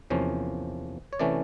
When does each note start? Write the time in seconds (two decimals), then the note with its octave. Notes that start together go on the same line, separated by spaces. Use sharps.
0.10 E2 C3 F3 A#3 C#4
1.13 C#5
1.19 C3 E3 A3 C#4 D5